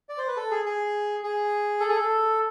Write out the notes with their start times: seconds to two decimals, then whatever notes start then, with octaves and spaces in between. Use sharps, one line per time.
0.09 D5
0.18 C5
0.28 B4
0.37 A4
0.51 G#4
0.66 G#4
1.23 G#4
1.80 A4
1.89 G#4
1.97 A4